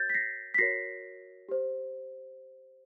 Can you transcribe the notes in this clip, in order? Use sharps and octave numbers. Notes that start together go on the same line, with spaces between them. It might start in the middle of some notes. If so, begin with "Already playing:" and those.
Already playing: F#4 A#4 C#5 G6 A6
B6
A#6 C7
B6
F#4 A#4 C#5 A#6 C7
G4 C5